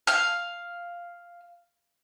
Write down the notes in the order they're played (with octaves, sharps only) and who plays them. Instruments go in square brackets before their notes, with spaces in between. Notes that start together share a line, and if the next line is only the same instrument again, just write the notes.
[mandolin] F5 F6